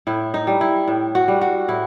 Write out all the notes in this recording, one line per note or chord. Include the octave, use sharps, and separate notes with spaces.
A2 E4
D#4
G3
E4
A2
F#4
G3
F#4
A2 E4